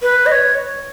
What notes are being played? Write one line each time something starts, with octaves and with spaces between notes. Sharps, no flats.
B4
D#5
C#5